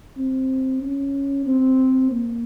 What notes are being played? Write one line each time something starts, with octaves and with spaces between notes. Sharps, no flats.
C4
C#4
C4
A#3